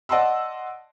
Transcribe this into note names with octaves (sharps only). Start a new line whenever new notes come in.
D5 D#5 F#5 A5 C6 E6